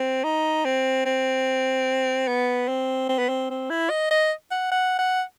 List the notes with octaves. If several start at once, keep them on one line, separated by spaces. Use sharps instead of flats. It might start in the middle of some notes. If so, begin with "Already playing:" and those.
Already playing: C4
D#4
C4
C4
B3
C4
C4
B3
C4
C4
E4
D#5
D#5
F#5
F#5
F#5